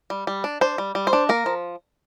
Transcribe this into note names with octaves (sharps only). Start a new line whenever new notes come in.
G3
G3
D4
D4 C5
G3
G3
C5
D4
A#3 A#4
F3